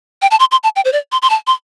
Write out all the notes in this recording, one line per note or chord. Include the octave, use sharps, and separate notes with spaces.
G5
A5
C6
C6
A5
G5
C5
D5
C6
C6
A5
C6